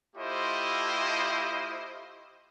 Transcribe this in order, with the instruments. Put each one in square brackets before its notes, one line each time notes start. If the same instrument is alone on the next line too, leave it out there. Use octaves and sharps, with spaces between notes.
[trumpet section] A3 E4 F4 G4 C5 D#5